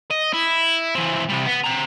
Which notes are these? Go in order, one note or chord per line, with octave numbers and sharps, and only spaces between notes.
D#5
E4
E3 C4
C3 G3
B3
C4 A#5